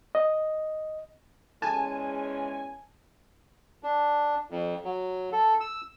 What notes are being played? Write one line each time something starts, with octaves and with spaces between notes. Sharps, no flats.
D#5
E2 G#3 C#4 G#5 A5
D4
F2
F#3
A4
E6